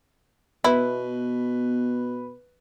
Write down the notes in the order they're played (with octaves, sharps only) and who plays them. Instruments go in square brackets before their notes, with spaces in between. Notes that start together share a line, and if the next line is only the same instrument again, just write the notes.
[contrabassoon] B2 [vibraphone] B3 [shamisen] E4 [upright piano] B4